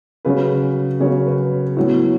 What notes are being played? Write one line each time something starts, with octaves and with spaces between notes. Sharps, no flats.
C#3 F#3 C#4 B4
C#3 F#3 C#4 C#5
B4
A2 F#3 B3